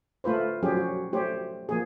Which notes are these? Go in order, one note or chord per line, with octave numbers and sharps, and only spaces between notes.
A3 F4 B4 C5
F3 F#3 C#4 G4 G#4 C5
F#4
A3 G4 C5 C#5
F3 A#3 G#4